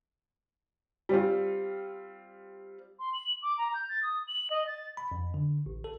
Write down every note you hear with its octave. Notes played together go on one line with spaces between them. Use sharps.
G3 C4 F4
C6
F#7
D6
A#5
G6
A6
D#6
F#7
D#5
A6
B5
F2
D3
A1
A4